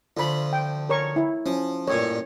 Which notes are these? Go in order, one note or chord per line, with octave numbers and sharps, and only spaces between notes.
D2 F3 F4 B5
G5
A#4 C#5 C#6
E4
F3 C#4
A1 G2 A#2 C#5